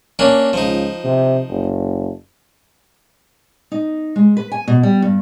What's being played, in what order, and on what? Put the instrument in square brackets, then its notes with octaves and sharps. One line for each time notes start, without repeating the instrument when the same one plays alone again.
[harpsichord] A#3 C#4 D4
[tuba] C#2 [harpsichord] F3 D#4
[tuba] C3
F#1
[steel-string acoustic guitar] D#4
G#3
B4
G#5
B2
G3
G2